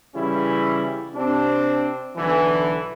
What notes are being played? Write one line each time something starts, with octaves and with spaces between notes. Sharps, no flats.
C#3 E3 G3 C#4 E4
C3 C4 D4
B1 D3 E3